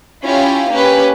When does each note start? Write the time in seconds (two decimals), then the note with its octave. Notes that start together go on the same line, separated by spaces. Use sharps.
0.24 C#4 E4 F4 G4 F5
0.71 A#3 C#4 G4 B4